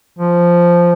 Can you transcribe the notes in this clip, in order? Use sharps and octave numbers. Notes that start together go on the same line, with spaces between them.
F3